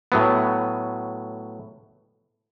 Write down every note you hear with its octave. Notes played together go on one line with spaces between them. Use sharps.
A2 F#3 B3